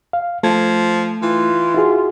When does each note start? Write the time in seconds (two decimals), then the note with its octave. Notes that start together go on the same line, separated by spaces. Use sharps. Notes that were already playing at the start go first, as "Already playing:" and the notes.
0.13 F5
0.43 F3 A3 G#6
1.22 E3 F4
1.74 E4 F#4 G#4